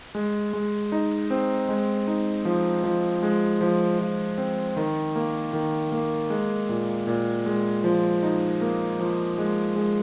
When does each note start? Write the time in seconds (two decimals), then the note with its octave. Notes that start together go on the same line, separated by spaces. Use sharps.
0.15 G#3
0.53 G#3
0.92 D#4
1.30 C4
1.69 G#3
2.07 D#4
2.45 F3
2.84 F3
3.23 G#3
3.61 F3
3.99 F3
4.38 C4
4.77 D#3
5.16 A#3
5.53 D#3
5.92 A#3
6.30 G#3
6.69 A#2
7.07 A#2
7.46 G#3
7.84 F3
8.23 D#4
8.61 A#3
9.00 F3
9.38 G#3
9.76 G#3